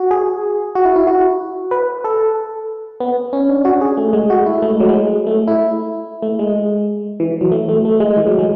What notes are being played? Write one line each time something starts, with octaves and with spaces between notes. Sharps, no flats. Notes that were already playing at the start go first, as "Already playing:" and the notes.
Already playing: F#4
G#4
F#4
E4
E4
F#4
B4
A4
B3
C#4
D4
F#4
G#4
A3
G#3
F#4
E4
A3
G#3
F#3
G#3
A3
E4
A3
G#3
E3
E3
F#3
A3
A3
A3
G#3
E3
F#3
G#3